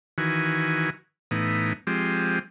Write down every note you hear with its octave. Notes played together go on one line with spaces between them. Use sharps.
D#3 E3 F#4 G#5
A2 E3 B3 D#4
F3 G#3 C4 G4